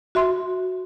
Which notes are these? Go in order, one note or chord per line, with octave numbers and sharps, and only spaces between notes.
F#4 E5 C6